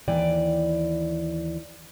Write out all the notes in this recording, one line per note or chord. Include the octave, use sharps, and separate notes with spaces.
D#2 E3 D5 G5